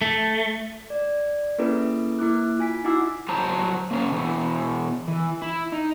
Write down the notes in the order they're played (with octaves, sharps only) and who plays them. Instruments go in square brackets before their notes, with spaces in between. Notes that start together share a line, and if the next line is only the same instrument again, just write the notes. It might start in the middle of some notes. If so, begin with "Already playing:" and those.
[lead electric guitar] A3
[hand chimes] D5
A#3 C#4 E4 G#4 A4 B4
A#3 E4 D6 F#6
F4 G#5 B6
D#4 E4 F#4 F#5 D6 E6
[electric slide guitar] F#3 C5 A5 A#5
A#3 C#4 F5
B2 E3 B3
E3
E4
D#4